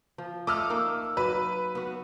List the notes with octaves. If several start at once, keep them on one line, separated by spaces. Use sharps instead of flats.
F3
A3 D#5 D6 E6 F6
A#3 D#4
F#3 B4
B3 F#4